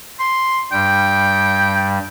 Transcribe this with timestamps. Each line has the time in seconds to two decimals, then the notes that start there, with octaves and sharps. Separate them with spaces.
0.20 C6
0.72 G2 G3 G5